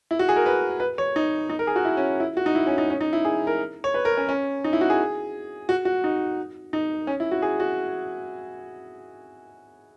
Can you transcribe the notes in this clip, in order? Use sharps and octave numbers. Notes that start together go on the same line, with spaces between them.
E4
F#4
G#4
A#4
B4
B4
C#5
D#4
D#4
A#4
G#4
F#4
E4
C#4
E4
F#4
D#4
E4
C#4
D#4
C#4
D#4
E4
G#4
A#4
C#5
B4
A#4
C#4
C#4
D#4
E4
F#4
G#4
F#4
F#4
D#4
D#4
C#4
E4
F#4
G#4
F#4